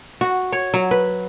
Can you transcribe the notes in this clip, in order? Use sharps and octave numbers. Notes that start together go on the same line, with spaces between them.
F#4
C#5
F#3
B4